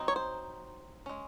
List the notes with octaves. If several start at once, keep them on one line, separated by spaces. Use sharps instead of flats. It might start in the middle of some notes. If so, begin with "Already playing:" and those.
Already playing: F#3 C4 D#4
C#5
C5
G#3 C#4